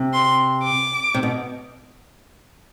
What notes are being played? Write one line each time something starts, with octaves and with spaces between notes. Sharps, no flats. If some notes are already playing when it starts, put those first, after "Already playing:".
Already playing: C3
C6
D6
C3
B2